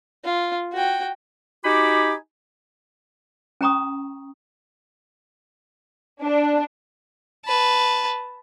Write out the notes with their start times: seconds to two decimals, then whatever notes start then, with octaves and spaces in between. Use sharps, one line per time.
0.24 F4
0.72 F#4 G5
1.64 D#4 F#4 G4 G#5 B5 D6
3.61 C#4 G5 A#5 C#6 D#6
6.22 D4
7.46 B4 A5